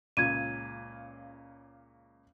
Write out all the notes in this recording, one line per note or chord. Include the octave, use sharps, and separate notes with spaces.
C#2 A#2 C#3 G#6 D#7